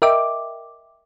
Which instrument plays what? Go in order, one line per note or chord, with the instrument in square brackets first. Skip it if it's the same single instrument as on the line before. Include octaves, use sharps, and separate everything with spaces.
[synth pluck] A#4 D#5 E5 G5 D6